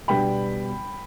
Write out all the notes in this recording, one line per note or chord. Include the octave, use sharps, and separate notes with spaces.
B2 G3 B3 D4 G5 B5